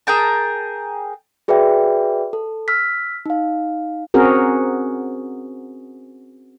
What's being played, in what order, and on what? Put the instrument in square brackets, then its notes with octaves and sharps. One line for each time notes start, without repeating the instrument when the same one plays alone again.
[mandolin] G#4 A#4 G5 A5
[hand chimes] F#4 G#4 B4 D5 E5 G5
A4
E6 F6 B6
D#4 F5
[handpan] C4 C#4 F#4 G#4 A#4